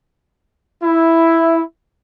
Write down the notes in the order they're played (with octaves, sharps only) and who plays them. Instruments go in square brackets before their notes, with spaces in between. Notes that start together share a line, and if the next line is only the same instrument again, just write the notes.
[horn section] E4